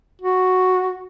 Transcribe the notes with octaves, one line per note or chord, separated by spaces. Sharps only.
F#4